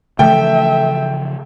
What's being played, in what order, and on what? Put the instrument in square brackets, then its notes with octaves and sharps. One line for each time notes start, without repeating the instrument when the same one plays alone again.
[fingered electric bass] C#3 E3 F3 [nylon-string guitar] A3 [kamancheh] E5 [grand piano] G5